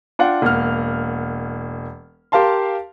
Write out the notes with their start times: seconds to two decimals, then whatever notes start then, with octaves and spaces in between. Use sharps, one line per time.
0.19 D4 F4 F#5 G5
0.42 E1 A#3 F#5 F6
2.32 G4 A#4 F5 A5 C6